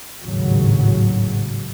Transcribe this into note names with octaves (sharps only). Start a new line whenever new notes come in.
G#1 D#2 A2 C#3 F#3